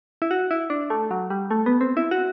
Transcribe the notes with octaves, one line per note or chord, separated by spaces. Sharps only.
E4
F#4
E4
D4
A3
F#3
G3
A3
B3
C4
E4
F#4